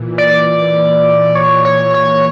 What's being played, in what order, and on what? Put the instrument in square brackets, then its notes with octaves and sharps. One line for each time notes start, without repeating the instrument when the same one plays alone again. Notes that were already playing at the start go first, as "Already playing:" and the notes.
Already playing: [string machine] A#2 E3
[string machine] E3 [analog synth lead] D5
[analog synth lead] C#5
C#5
C#5